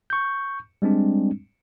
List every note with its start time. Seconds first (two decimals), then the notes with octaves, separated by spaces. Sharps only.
0.10 C#6 G6
0.82 G3 G#3 C4 D4